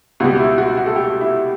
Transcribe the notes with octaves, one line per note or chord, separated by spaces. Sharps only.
C#2 B2 G3 F#4
E4
F#4
F#4
A4
G4
E4